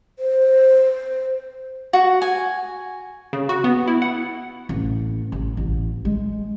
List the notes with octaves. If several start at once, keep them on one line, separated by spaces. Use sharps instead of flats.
C5
F#4
G#5
C#3
F#4
B3
E4
F#5
A1
A1
A1
G#3